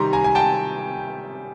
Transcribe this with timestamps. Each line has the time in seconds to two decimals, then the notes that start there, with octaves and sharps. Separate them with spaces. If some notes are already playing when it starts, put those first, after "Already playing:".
Already playing: C3 D#3 G3 A#5 C6
0.13 G#5 A#5
0.24 G#5
0.35 G5 A5